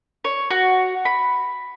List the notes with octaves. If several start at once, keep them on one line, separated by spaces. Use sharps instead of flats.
C#5
F#4
B5